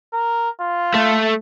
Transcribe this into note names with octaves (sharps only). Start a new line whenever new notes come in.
A#4
F4
A3